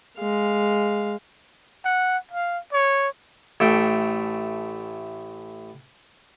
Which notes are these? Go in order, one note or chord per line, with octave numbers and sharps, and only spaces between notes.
G#3 F5
F#5
F5
C#5
A1 A3 G5